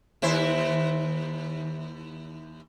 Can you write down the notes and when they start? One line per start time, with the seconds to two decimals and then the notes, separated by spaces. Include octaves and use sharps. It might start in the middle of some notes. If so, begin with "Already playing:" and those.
0.22 D#2 E4 C5